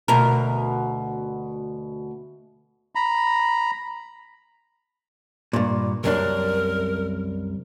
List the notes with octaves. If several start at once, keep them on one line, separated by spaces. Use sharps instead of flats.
D2 B2 A#4
A#5 B5
G2 A#2
C2 F#2 D4 A#4